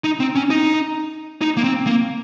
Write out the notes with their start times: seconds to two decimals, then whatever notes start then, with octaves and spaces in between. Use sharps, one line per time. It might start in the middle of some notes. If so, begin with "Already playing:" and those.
0.04 D#4
0.20 C4
0.35 C#4
0.50 D#4
1.41 D#4
1.57 A#3
1.64 C4
1.86 A#3